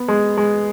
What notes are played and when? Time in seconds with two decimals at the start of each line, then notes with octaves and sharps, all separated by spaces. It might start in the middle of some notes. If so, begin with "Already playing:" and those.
Already playing: B3
0.08 G#3
0.37 G#3